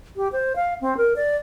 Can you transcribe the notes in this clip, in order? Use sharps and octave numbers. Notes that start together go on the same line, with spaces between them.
G4
C5
F5
C4
A#4
D5